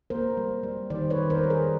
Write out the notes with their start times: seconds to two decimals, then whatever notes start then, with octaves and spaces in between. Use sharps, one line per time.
0.10 A#3 A#4 C5
0.37 G3
0.63 G3
0.90 D#3 C5 D5
1.10 B4 C#5
1.17 D#3
1.30 A#4 C5
1.43 G3
1.50 G#4 A#4